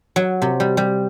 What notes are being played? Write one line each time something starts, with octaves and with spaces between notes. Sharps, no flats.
F#3
C3
G3
G3